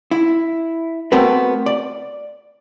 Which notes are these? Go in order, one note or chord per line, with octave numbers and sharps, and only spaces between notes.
E4
A3 B3 C4 F#4 A#4 B4
D5